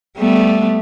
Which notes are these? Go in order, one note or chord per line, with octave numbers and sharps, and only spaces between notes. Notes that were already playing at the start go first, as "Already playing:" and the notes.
G3 A3 B3